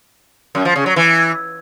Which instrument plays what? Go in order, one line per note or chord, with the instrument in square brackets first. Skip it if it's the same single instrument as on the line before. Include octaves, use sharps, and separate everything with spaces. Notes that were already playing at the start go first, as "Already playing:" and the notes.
[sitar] F#2
F3
C#3
F#3
E3